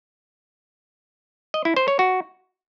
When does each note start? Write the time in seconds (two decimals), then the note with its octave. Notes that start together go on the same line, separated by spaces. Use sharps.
1.54 D#5
1.65 E4
1.77 C5
1.88 C#5
1.99 F#4